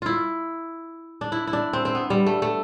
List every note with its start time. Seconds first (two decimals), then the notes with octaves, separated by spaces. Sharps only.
0.02 E4 F4
1.21 D4
1.32 E4
1.47 E4
1.53 D4
1.73 C4
1.85 C4
1.95 B3
2.10 G3
2.26 A3
2.42 A3